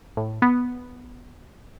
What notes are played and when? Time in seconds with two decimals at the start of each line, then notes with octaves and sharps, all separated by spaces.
0.17 A2
0.42 B3